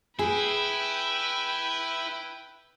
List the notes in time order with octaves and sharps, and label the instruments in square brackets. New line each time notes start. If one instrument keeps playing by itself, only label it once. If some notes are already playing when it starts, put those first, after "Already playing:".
[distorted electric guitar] E4 [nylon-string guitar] G#4 [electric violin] B4 G5